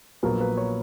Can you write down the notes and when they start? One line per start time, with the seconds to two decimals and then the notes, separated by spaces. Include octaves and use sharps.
0.23 A#1 A#2 F#3 B3 A#4
0.41 B4
0.57 C#5